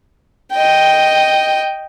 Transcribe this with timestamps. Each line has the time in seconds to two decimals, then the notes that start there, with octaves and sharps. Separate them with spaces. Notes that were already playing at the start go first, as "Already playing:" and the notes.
0.53 D#5 G5